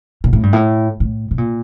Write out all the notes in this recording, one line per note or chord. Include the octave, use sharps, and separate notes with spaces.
A#2
A2
G2
A2
A2
C3
A#2